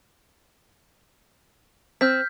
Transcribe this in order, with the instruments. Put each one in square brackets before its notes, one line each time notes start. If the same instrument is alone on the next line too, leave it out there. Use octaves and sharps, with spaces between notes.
[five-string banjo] C4 [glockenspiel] F6 G6 B6